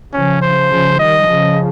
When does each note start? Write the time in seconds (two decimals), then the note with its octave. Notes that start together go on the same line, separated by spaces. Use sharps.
0.13 C#3 F3 C#4
0.42 C5
0.71 C#3 F3
0.99 D#3 G3 D#5
1.28 C#3 F3